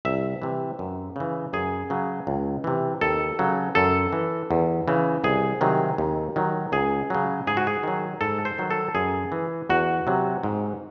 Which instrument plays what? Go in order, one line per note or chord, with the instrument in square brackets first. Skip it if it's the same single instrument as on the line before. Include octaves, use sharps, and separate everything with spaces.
[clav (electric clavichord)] C2 E5
C3 E3
F#2
C#3 E3
F#2 G#4
C#3 F#3
C#2
C3 E3
D#2 A4
C#3 F#3
F#2 A4
E3
E2
C#3 E3
C2 G#4
C3 D#3 F#3
D#2
D#3 F#3
C#2 G#4
C#3 F#3
G#2 G#4
F#4
G#4
D#3 F#3
G#2 A4
C5
D#3 F#3
A4
F#2 G#4
E3
E2 F#4
C3 F#3
G#2